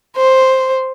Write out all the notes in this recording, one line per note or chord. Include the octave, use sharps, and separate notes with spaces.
C5